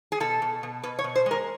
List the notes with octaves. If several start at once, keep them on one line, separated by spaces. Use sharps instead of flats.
G#4
B2 A4
B2
B2
B2 B4
C#5
B2
C5
G#3 A#4